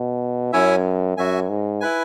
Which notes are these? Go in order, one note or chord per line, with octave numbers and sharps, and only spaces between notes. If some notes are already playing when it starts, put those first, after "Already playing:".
Already playing: B2
F#2 C#4 E4 C#5 E5 G#5
F#2 F#4 E5 G#5
G#2
E4 B4 G#5